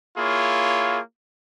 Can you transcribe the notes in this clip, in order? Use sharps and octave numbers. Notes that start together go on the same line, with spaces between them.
A#3 E4 F4 G#4 C#5